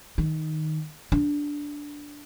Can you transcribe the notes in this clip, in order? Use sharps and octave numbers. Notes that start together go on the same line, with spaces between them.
D#3
D4